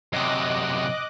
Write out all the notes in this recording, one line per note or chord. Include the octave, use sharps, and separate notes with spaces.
F#2 C3 D#5 D6 F#6